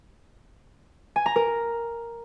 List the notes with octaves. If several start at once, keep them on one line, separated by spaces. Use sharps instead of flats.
G#5
A#5
A#4